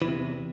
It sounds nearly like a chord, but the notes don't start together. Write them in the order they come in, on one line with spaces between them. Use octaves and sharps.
E3 E2 C3